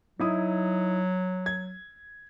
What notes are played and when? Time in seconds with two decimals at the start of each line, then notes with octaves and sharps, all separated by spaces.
0.19 F#3 D#4 E4 D#6
1.46 G#6